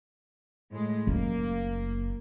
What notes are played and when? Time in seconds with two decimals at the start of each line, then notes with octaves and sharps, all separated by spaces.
0.71 A2 G#3
1.07 F#1 A#3